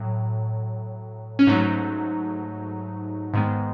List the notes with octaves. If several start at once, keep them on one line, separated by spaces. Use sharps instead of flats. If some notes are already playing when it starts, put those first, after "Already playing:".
Already playing: A2 F#3
C#4
G#2 F#3 A3 D#4
G#2 D#3 G#3 B3